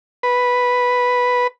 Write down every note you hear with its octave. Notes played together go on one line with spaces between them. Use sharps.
B4